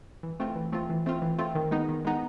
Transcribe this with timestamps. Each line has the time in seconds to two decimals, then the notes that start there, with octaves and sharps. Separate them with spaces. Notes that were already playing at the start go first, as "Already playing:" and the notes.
0.23 E3
0.40 A3 C4 F4
0.56 E3
0.72 A3 C4 F4
0.90 E3
1.06 A3 C4 F4
1.22 E3
1.39 A3 C4 F4
1.55 D#3
1.71 G#3 B3 D#4
1.89 D#3
2.05 G#3 B3 D#4